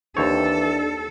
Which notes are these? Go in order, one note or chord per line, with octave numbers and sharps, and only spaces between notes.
D#2 E3 C4 D4 A4 C#5